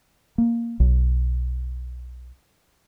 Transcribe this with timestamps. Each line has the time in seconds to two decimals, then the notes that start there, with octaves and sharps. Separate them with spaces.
0.38 A#3
0.80 B1